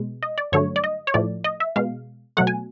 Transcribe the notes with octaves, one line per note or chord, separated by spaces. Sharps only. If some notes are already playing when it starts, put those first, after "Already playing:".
Already playing: B2 G#3
D#5
D5
G2 D3 F#3 A3 C#5
D5
D#5
C#5
A2 F3 A3 D5
D#5
E5
B2 G#3 F5
B2 F#3 A3 F#5
G#5